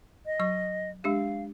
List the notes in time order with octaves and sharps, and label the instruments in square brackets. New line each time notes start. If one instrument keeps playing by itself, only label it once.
[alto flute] D#5
[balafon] F#3 C#6
[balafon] G#3 D4 G4 [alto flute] F5